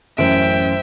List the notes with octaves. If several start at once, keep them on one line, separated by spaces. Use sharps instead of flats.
A1 F#2 C5 E5 G5 D7